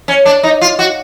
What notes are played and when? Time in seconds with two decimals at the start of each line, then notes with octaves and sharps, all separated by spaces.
0.08 C#4
0.25 D4
0.43 D#4
0.61 F4
0.79 F#4